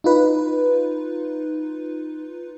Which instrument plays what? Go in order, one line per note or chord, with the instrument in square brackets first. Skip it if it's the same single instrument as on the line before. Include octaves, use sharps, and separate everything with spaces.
[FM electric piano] D#4 F4 B4